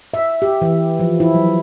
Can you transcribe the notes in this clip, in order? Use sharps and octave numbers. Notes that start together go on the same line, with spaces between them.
E5
G4
E3
F3
E4
F#3